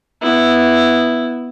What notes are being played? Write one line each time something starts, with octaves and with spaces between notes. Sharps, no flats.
B3 E4